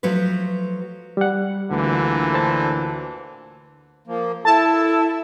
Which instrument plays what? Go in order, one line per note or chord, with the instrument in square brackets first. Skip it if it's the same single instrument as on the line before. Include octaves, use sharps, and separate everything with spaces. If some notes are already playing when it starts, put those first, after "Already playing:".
[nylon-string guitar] F3 F#3 A3 B4
[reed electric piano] G3 F#5
[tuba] D2 [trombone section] A#2 D3 E3
[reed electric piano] C5 A5
[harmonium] F3 A#3
[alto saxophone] E4 [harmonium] A4 [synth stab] A5